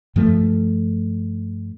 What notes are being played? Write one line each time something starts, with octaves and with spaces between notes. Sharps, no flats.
G2 F3 A3